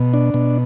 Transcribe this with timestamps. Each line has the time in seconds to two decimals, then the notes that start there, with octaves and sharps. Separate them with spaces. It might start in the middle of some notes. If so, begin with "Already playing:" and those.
Already playing: B2
0.14 D4
0.34 B2